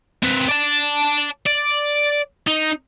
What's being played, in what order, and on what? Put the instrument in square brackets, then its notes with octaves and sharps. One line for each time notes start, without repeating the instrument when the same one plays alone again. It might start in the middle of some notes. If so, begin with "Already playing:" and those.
[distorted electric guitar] C4 B4
D5 A5
D5
D#4